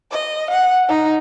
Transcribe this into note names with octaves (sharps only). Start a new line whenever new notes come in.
D#5
F#5
D#4